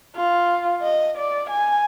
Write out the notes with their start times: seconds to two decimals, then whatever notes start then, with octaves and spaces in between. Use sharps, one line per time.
0.16 F4
0.82 D#5
1.18 D5
1.50 G#5